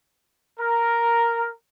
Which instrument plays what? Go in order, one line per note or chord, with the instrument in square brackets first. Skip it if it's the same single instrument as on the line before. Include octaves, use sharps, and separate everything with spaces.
[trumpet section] A#4